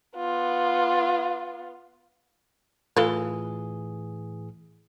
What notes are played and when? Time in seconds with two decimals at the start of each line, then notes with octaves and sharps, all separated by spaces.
0.16 B3 F4
2.97 A2 E3 F4 G#4 A4 B4